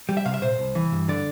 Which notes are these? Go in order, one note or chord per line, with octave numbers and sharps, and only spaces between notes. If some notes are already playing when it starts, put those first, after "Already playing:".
G3
E5
C3 F5
E5
A#2 C5
C2
E3
G2
D3 D5